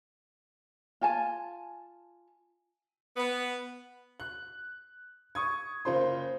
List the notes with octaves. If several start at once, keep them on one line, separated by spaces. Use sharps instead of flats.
F4 G#5 A5
B3
F#6
C#6 D#6 G#6
F#1 F4 C5 C6